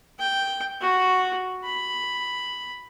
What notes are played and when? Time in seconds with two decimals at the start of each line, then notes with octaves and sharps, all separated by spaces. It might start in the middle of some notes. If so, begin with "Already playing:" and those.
0.19 G5
0.81 F#4
1.64 B5